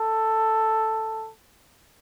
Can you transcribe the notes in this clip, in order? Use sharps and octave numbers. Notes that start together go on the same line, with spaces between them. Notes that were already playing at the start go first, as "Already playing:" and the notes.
Already playing: A4